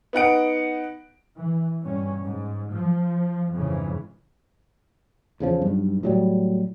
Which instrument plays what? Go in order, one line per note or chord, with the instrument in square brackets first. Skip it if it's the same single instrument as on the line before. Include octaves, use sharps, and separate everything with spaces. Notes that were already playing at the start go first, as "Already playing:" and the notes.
[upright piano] B3 D#4 F#5 D7
[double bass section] E3
G2 B2 C#4
G#2
F3
F2 G#2 C#3 E3
[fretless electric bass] E2 C#3 F3
B1 G2
A2 F#3 G3